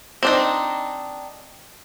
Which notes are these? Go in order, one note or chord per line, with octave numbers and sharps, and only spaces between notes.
C4 D4 D#4